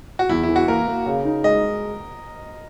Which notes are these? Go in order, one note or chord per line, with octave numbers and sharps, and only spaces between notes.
F#4
E2 E4
E4
E3
F#4
A#3 A#4
A#3
C#3
D#4
G#3 D#5